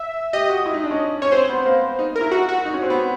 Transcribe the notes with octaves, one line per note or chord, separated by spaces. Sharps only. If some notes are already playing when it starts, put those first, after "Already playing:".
Already playing: E5
G4 D#5
F#4
E4
D#4
D4
C#4
C#4 C#5
C4 C5
B3
A#3
D#4
A#4
E4
F#4
F#4
D#4
C#4
C4
B3